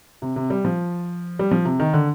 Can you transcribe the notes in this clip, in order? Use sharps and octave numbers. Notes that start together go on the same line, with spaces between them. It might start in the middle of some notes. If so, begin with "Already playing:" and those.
C3
C3
G3
F3
G3
F3
C3
D#3
D3